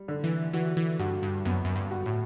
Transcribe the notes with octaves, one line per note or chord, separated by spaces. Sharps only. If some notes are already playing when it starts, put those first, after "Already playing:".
Already playing: G3
D3
E3
E3 F#4
E3
G2 F#4
G2
F#2 B3
F#2
G2
F#4
A2